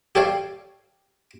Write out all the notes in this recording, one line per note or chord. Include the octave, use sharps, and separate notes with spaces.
G4 A4 C#5 D5 F5